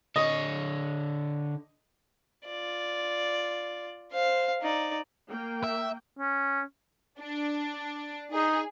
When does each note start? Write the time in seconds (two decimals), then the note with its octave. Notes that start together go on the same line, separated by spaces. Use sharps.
0.16 D3 C#5 D#5
2.45 F4 D5
4.12 C5 F5
4.61 D#4 D5
5.28 A#3 G5
5.64 E5
6.19 C#4
7.20 D4
8.32 D#4 G#4